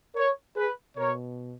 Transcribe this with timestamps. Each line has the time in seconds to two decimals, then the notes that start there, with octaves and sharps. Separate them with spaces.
0.15 A#4 C#5
0.56 G#4 B4
0.97 B2 A#4 C#5